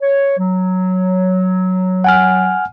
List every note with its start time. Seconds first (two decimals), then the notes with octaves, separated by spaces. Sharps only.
0.01 C#5
0.38 F#3
2.04 F#5 G#5 F6